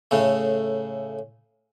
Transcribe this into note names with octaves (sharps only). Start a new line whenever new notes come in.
A2 C#3 A3